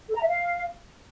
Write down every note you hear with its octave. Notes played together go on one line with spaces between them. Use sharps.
A4
A#5
E5
F5